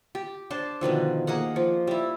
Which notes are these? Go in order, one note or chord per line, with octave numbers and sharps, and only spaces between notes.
G4
D4 C5 A5
B2 D3 D#3 F3
A#3 G#4 D#5 F#5
F3
G3 E4